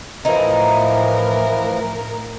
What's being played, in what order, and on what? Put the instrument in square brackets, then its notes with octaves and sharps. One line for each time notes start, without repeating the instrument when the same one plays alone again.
[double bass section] A2 [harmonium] E3 F3 [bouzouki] D#4 E4 [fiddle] A#4